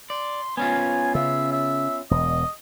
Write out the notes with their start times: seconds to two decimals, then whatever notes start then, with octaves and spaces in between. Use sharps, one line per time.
0.10 D5 C6
0.57 B3 C#4 F4 G#5
1.15 C#3 E5
1.52 E5
2.11 E1 D#5